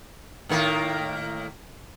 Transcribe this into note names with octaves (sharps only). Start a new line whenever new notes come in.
A2 D#3 A#3